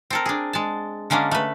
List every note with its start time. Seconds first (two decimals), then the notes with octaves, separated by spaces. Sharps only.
0.10 C4 A4 A#4
0.26 D4 G#4
0.53 G#3 A5
1.10 D3 G#3 A#3 C#4 D4
1.31 A3 B4